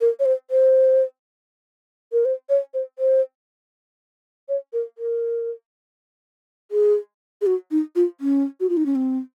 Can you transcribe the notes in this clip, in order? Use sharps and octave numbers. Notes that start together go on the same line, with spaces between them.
A#4
C#5
C5
C5
A#4
C5
C#5
C5
C5
C#5
A#4
A#4
G#4
G#4
F#4
D#4
F4
C#4
F#4
F4
D#4
C#4
C4